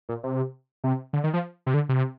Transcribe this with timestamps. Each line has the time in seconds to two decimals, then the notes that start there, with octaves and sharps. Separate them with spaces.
0.09 A#2
0.23 C3
0.84 C3
1.13 D3
1.24 D#3
1.34 F3
1.66 C3
1.74 D3
1.89 C3